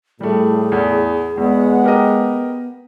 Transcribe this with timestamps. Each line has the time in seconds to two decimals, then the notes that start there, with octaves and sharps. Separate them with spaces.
0.21 A2 G3 A3 G#4
0.72 E2
1.38 E2 G#3 B3 F#5
1.84 G4 A#4 D#5